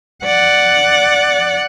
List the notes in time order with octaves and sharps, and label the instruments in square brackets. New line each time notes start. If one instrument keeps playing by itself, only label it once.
[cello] D5 F#5